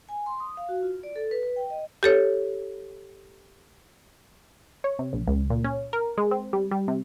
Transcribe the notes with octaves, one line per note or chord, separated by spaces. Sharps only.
G#5
C6
D#6
F5
F#4
F4
D5
A4
B4
B4
G5
D#5
G4 A4 C#5
C#5
C3
A#1
C#2
A#2
C#4
A#4
G#3
C4
G3
G3
C3